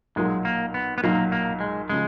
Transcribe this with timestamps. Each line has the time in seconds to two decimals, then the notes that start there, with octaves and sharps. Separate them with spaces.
0.16 B1 A#2 F#3 G#3
0.45 A#3
0.74 B3
0.98 B3
1.03 B1 A#2 F#3 A#3
1.32 A#3
1.60 G#3
1.89 C#3 F3 G#3